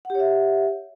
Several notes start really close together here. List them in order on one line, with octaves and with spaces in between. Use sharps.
F#5 G4 C#5 E5